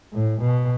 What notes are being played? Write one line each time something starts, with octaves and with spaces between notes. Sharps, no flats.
A2
B2